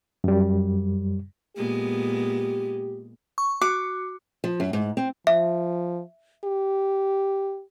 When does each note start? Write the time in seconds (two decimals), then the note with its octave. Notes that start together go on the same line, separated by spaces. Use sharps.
0.24 F#2 G3
1.56 A#2 G#3 B3 G4
3.38 C#6
3.61 F#4 D6
4.44 F3
4.60 F#2
4.73 G#2
4.97 C4
5.27 F3 E5
6.44 G4